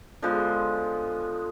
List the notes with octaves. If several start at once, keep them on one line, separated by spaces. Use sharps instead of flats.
D3 F3 G#3 B3